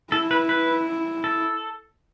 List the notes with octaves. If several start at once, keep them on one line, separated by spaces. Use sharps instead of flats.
E4 A4
B4
B4
A4